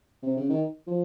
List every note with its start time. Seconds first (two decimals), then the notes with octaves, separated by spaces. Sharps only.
0.23 C3
0.37 C#3
0.50 D#3
0.87 F3